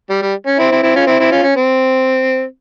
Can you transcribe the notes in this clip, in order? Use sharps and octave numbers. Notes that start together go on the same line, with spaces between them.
G3
G3
C#4
C4 E4
C4 E4
C4 E4
C#4 F4
C4 E4
C4 E4
C#4 F4
C#4
C4